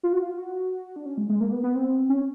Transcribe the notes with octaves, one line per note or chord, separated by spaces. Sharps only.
F4
F#4
F4
F#4
D4
C#4
G#3
G#3
A#3
B3
B3
C4
C#4